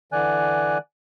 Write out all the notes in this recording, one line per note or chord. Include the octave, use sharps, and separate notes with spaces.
D3 E3 D5 G#5 F#6